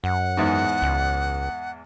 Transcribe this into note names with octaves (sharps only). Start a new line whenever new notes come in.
F#2 F#5
E2 G#2
C#2